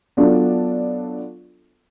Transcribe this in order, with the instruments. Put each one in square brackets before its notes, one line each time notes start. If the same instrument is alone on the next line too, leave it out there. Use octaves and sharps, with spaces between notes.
[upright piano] F#3 B3 D4 F4 A4